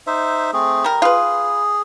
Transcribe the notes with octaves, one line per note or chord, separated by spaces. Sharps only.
D#4 C5 E5
A3 C4 G#4
G3 A#4
F4 G#4 B4